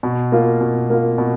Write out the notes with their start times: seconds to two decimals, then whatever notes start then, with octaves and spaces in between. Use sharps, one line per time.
0.03 B2
0.32 A#3 F4
0.61 B2
0.90 A#3 F4
1.18 B2